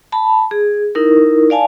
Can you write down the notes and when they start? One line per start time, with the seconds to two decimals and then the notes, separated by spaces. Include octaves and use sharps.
0.12 A5 B5
0.51 G#4
0.95 D#4 E4 A#4
1.50 D5 F5 G#5 A5